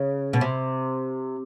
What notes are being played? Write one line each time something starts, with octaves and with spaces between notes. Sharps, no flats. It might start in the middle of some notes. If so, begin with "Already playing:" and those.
Already playing: C#3
B2
C3